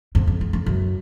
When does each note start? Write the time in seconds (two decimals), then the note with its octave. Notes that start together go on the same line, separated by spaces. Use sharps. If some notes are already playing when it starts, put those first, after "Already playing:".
0.15 F2
0.27 F2
0.41 F2
0.53 F2
0.66 F#2